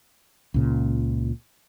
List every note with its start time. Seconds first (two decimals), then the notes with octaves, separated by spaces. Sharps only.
0.54 C#2 A#2 C#3